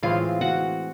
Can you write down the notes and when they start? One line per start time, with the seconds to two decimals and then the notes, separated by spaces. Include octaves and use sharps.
0.03 A2 E3 G#3 C4 F4 F5
0.41 F#4 F#5